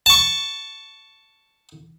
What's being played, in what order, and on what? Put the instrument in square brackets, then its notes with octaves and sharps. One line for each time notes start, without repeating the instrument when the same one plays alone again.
[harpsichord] A5 C#6